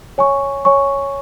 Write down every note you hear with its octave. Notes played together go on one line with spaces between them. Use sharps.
C#5 G#5 C#6
C#5 G#5 C#6